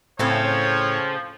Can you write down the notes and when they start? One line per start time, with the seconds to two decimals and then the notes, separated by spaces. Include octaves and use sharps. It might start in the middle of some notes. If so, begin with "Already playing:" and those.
0.19 A2 C#3 F3 C4 A4 C#5